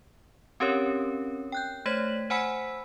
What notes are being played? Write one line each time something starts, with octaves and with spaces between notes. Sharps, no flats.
C4 C#4 G4 A#4 C#5
G5 F#6 G6
A3 C5 C#5 G#6 B6 F#7
C5 F#5 G#5 B5 E6 B6